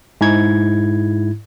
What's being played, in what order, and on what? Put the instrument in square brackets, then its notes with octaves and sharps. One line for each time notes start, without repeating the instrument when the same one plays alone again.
[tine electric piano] G#2 E4 G#6